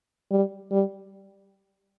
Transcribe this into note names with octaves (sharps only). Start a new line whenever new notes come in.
G3
G3